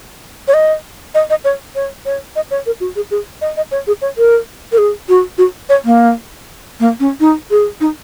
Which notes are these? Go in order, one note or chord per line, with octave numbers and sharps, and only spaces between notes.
C#5
D#5
D#5
D#5
C#5
C#5
C#5
D#5
C#5
A#4
F#4
G#4
G#4
D#5
D#5
C#5
G#4
C#5
A#4
A#4
G#4
F#4
F#4
C#5
A#3
A#3
C#4
D#4
G#4
D#4